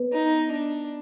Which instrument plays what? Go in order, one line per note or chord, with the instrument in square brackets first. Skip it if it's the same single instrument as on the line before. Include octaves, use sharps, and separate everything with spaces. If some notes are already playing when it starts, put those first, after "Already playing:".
Already playing: [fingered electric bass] B3
[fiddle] D#4
D4